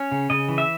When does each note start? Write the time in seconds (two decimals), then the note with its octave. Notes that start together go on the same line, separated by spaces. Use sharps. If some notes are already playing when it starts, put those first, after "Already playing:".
Already playing: C#4 C#5
0.12 C#3
0.30 C#3 D#5
0.48 E3
0.58 E5